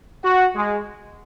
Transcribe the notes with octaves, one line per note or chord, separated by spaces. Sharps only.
F#4
G#3